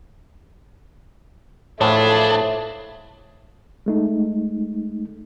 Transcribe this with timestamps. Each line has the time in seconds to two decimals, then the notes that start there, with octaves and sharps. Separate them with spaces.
1.81 A2 E3 F3 A3 D4 G#4
3.86 G#3 A3 D#4